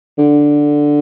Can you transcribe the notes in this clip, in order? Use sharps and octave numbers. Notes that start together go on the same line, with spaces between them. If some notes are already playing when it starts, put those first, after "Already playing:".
D3